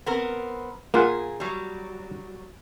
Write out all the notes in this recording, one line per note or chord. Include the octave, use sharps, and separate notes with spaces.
B3 C4 A#4
A#2 A#3 F4 G#4 F#5
F#3 G3